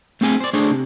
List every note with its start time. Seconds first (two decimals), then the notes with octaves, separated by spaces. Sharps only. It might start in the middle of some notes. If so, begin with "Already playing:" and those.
0.21 A3 C4 G#4 G#5
0.40 C5 D5
0.53 A3 D4 G#4 C5 C#5
0.71 C3